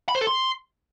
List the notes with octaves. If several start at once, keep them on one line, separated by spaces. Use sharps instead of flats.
B5
C5
A4
C6